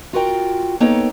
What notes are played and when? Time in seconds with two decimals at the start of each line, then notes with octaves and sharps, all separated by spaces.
0.13 F4 F#4 A#4 G5
0.80 A#3 B3 D#4 A4 C#5 G5